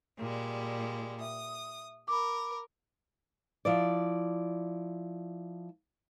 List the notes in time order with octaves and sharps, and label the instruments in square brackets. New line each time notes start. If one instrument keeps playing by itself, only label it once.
[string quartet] A#2 G3 G#3
[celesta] E5 [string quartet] D#6
[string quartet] A#4 [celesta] B5 D6
[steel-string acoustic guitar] F3 E4 D5